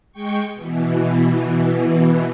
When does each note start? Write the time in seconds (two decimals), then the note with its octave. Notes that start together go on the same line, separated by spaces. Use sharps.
0.12 G#3 G5 C#6
0.54 B2 E3